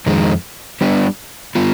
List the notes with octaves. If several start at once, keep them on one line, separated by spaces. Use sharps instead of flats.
F2 D#3 G#3
G3 B3 D4 G4
G3 B3 F4